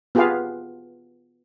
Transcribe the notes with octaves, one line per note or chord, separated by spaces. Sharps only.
B3 F4 G4 G#4 B4 F5